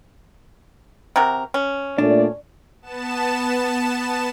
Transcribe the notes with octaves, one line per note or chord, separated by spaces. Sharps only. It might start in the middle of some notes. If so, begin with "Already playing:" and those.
C3 F#4 A#4
C#4
A#2 A3 D4 D5
B3 A5 E7